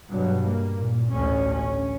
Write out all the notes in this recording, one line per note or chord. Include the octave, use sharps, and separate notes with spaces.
G2 B2 F#3
A#3
A#2
A1 D2 C#4
C#4